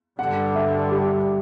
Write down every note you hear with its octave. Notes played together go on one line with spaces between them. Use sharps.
G2 D3 G3 F#5
E5
G4